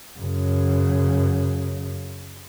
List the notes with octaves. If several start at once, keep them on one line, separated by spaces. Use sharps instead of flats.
F#2 C#3